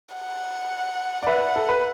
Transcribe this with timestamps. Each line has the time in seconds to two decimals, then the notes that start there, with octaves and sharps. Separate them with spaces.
0.16 F#5
1.23 D5
1.27 B4 E5 F#5
1.56 A4
1.69 B4